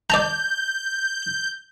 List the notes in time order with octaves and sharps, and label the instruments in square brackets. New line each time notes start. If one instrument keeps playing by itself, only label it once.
[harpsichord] D5 A5 A#5 [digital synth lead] G6